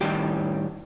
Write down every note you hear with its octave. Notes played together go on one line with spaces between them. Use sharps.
A2 D#3 G3 G4